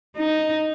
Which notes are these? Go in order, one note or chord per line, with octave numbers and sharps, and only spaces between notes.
D#4